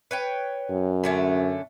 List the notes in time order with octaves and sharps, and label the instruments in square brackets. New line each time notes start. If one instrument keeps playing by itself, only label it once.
[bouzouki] B4 C#5 G5
[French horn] F#2
[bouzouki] D3 A3 C#4